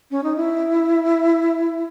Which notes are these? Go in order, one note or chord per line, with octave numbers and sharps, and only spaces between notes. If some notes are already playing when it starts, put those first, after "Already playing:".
C#4
D#4
E4